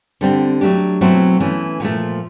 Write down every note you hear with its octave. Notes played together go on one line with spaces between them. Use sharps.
D3 G3 C4
F#3 A3 D4 G4
B2 F#3 A3 C4 E4
E3 A3 C#4
A#2 F3 A3